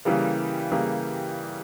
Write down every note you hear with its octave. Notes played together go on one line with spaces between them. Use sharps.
C#3 E3 G3 A#3
C#3 E3 G3 A#3